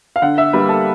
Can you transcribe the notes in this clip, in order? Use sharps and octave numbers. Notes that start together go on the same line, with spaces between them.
F5
D3 F#5
E5
G3 A#3 B4
A4